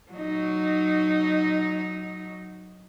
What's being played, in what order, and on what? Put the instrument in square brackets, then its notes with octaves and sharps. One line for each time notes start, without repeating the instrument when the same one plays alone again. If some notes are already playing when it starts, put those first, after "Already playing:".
[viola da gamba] F#3 D#4